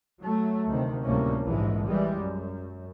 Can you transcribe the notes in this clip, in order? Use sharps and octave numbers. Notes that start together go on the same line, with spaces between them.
F#3 A3
D2 C3 D#3 C4
D2 A2 C3 G3 A#3 C#4
A#1 G#2 E3 G#3
E3 G3 G#3
F#2